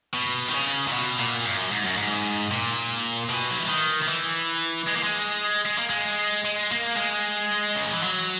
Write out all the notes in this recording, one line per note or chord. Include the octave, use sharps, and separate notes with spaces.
B2
D#3
C#3
A#2
B2
A#2
F#2
G#2
F#2
G#2
A#2
B2
F#3
E3
D#3
D#3
E3
G#3
A#3
G#3
G#3
A#3
G#3
G#3
A#3
G#3
C#3
D#3
E3
F#3